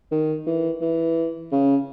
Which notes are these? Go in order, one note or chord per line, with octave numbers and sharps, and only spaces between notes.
D#3
E3
E3
C#3